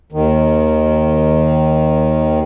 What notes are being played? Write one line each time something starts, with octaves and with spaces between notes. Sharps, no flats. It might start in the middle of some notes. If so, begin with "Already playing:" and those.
D#2 D#3